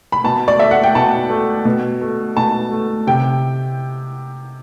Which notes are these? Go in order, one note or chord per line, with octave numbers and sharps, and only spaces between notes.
B5
B2 A5
D5
A3 E5
F#5
G5
B2 A5
A3
B2
A3
B2 A5
A3
C3 G5